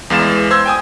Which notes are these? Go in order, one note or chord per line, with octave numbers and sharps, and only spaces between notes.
E2 E3 G#3 F5 A6 E7
C5 C6 E6 G#6
G5 G#5 D#6